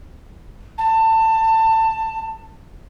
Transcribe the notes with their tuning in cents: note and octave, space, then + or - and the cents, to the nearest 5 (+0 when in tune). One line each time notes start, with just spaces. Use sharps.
A5 +20